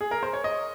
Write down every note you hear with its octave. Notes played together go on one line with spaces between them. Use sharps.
G#4
A#4
C5
C#5
D#5